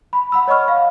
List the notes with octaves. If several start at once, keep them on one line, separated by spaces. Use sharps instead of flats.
B5
F#5 B5 E6
C#5 D#5 B5 C#6 F6
F5